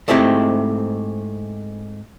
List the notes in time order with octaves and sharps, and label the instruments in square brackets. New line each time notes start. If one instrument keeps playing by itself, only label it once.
[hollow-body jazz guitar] G#2 A3 C4 E4 G4